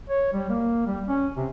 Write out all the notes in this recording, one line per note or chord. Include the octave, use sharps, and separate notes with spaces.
C#5
G3
A#3
G3
C#4
C3